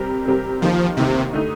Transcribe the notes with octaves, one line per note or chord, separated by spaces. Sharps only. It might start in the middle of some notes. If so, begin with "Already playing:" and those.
Already playing: C3 G3 C4 G4 A#4
C3 G3 C4 G4 A#4
D#2 D#3 F3 A#3
D#2 C3 D#3 A#3
D3 A3 D#4